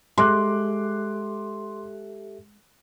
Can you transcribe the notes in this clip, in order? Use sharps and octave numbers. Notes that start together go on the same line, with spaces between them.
G#3 G4 A4 E5 C6 D6 F#6